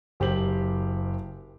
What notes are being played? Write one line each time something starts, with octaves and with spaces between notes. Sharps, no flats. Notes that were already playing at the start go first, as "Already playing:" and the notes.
F#1 G4 C5 F#7